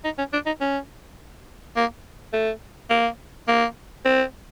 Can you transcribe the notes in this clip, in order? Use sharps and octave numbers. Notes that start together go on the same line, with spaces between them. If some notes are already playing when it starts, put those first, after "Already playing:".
D#4
C#4
D4
D#4
C#4
A#3
A3
A#3
A#3
C4